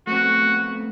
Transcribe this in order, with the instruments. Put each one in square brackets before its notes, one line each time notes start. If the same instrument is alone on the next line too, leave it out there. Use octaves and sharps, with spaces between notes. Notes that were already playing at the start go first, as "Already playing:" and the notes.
[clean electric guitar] A3 B3 C4 [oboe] F#4